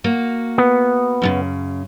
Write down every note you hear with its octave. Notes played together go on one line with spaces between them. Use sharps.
A#3 F#4
B3
F#2 A2 C#3